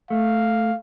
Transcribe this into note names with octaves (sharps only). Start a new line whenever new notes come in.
A3 F5